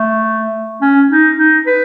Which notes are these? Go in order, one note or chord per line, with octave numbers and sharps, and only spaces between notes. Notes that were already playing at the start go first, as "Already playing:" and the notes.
Already playing: A3
C#4
D#4
D#4
B4